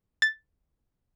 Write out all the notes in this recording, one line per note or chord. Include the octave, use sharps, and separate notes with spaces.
A6